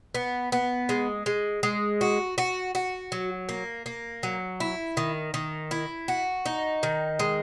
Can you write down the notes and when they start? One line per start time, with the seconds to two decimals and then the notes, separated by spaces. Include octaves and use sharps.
0.15 B3
0.52 B3
0.89 G#3
1.26 G#3
1.63 G#3
2.01 F#4
2.38 F#4
2.75 F#4
3.12 F#3
3.49 A#3
3.86 A#3
4.23 F#3
4.60 E4
4.97 D#3
5.34 D#3
5.71 E4
6.08 F#4
6.46 D#4
6.83 D#3
7.19 G#3